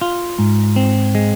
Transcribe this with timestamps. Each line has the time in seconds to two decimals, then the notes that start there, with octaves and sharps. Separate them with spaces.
0.01 F4
0.39 G#2
0.76 C4
1.15 G#3